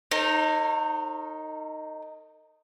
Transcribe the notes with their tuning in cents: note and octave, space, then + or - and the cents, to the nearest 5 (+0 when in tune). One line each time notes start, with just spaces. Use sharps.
D#4 +0 A#4 -45 C#5 -45